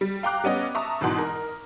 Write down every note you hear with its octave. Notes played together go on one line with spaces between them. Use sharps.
G3
F5 G5 A#5 D6 F#6
G3 B3 C#4 D#5
E5 A5 A#5 C#6 D#6
G#1 G#2 B2 E3 F#5 C6
A#4